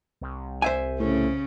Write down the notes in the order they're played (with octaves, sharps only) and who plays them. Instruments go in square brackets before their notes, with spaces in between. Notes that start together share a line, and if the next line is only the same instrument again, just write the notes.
[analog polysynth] C2
[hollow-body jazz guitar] C5 E5 G#5
[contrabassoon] A2 [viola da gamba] C#3 C#4